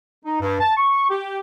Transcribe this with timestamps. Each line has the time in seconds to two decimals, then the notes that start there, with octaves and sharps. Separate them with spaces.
0.25 D#4
0.41 G2
0.60 A5
0.77 C#6
1.10 G4